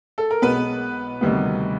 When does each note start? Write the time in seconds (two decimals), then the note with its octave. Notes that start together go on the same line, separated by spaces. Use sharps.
0.18 A4
0.31 A#4
0.42 B1 B2 G#3 B3 B4
1.21 D2 C3 D#3 G3 B3